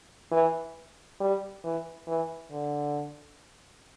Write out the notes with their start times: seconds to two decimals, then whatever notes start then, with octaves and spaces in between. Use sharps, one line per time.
0.32 E3
1.20 G3
1.64 E3
2.08 E3
2.52 D3